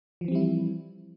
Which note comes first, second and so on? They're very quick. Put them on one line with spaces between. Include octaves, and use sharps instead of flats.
F3 E3 C4 G3 E4